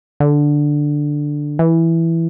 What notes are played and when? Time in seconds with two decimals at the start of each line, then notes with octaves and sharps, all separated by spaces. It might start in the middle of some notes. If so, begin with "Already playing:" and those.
0.20 D3
1.59 E3